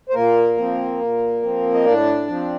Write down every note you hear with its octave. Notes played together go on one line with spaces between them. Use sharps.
C5
A#2 A#3 A#4
F3 C4
A#2
F3 C4
D#5
A2 D4 D5
F3 C4